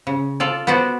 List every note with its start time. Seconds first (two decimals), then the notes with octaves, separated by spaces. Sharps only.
0.07 C#3
0.40 F4 A4 D5
0.67 B3 F#4 C5 D5 A5